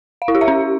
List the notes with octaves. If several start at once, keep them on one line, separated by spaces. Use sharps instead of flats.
F5
E4
G4
E5
C#4